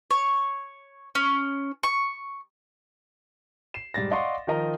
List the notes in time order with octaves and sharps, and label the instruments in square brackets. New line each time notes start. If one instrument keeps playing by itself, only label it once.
[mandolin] C#5
C#4
C#6
[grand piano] C7 E7
G#2 G3 A6 A#6
D5 D#5 F5 F#5 C6 C#6
D#3 F3 A#4 D#5 A#5